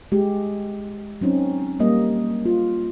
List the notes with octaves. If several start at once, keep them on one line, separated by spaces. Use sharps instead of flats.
G#3 G4
F#3 C4 C#4 D#4
G3 A#3 D#5
F4